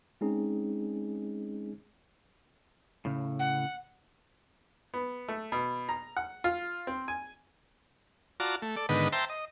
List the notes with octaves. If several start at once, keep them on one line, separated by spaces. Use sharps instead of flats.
G#3 C4 C#4 D#4 G#4
A2 C#3
F#5
B3
A3
B2
A#5
F#5
F4
C4
G#5
F4 F#4 D5 A5 A#5
A3
A4 D5
G#2 D3 D#3 B3 B4 D#5
C5 E5 G5 A5 A#5 C6
D#5